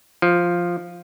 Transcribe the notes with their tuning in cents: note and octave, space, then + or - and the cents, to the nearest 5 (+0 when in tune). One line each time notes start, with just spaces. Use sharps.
F3 +0